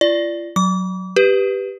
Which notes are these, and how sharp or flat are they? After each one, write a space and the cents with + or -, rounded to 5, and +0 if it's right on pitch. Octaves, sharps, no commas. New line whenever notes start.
F4 -40 D5 +0
F#3 +0 D6 -35
G4 +0 B4 +0